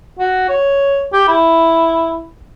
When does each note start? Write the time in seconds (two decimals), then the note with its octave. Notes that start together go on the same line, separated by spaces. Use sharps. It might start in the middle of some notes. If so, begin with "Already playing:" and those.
0.19 F#4
0.49 C#5
1.13 G4
1.28 E4